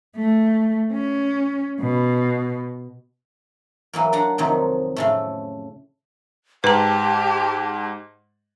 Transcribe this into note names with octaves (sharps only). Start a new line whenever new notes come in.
A3
C#4
B2
E3 F#3 A#3
D4 F#4 F#5 A#5
F2 C3 D#3 F#3
A2 C#3 A3
G#2 G4 B4 A5 A#5